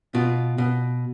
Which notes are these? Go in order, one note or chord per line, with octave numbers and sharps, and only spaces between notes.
B2 F4
B2